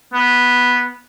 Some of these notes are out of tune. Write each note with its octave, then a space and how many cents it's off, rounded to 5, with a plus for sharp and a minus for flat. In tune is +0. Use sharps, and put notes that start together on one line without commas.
B3 -5